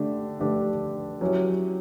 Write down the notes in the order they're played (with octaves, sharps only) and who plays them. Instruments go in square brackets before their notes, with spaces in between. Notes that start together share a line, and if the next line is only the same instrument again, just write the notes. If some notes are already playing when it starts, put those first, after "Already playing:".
Already playing: [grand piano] D3 A3 D4 G4
D3 A3 D4 G4
F#3 C#4 E4 G4